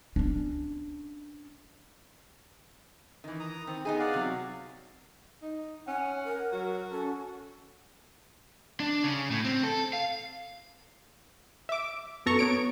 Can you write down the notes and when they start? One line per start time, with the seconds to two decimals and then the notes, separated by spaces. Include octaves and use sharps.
0.16 C#4 D4
3.24 D#3 E3
3.40 A#5 D#6
3.67 D#3 C4
3.85 B3 D#4 G#4
3.99 D5 F5 F#5
4.13 C3 F#3
5.42 D#4
5.87 C#4 F#5 G#5
6.24 A#4
6.53 F#3 F#4
6.91 C#4 A4
8.80 D4
9.04 C#3
9.31 A2
9.44 C4
9.63 A4
9.93 F5
11.69 E5 D6
12.26 F#2 B3 A4 A#5 C#6
12.39 B3 C#5 D7